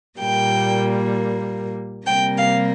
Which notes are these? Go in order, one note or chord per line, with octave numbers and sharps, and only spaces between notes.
A#2 G3 A#3 G5
C3 G3 A#3 G5
F5